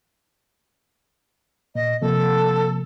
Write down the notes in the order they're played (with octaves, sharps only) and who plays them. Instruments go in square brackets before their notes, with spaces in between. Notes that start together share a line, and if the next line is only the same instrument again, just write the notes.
[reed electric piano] A#2 [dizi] D#5
[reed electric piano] C3 F3 A#3 [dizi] A4